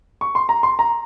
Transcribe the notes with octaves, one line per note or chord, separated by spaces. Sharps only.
C#6
C6
A#5
C6
A#5